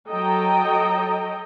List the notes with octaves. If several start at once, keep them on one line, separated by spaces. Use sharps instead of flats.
F#3 A4 D#5 G5 A#5